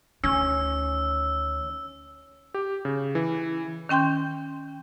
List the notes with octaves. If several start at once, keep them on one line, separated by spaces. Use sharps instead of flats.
D2 D#3 C#4 E6
G4
C#3
E3
D#3 C#4 G5 C6 G6